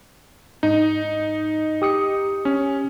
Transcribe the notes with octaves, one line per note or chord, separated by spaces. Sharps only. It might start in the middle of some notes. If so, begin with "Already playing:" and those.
G#2 D#4
G4 D#6 C#7
C#4